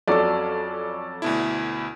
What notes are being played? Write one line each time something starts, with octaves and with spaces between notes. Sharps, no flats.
F2 F#3 C#4 A4 D5
D2 B2 E4